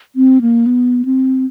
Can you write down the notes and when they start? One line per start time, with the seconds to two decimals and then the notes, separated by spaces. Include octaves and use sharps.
0.16 C4
0.41 A#3
0.66 B3
1.05 C4